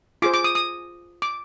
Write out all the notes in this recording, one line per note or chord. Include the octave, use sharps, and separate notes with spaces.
F4 G#4 C5 D6
D6
D#6
D#6
D6